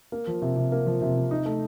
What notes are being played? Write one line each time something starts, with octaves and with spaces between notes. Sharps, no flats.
A#3
F3
C3
C3
A#3
F3
C3
C3
D#4
A3